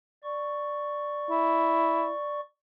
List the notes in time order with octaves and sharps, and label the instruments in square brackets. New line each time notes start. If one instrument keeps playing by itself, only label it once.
[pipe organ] D5 C#6
[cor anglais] E4